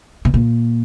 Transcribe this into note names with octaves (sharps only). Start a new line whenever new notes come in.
B2
A#2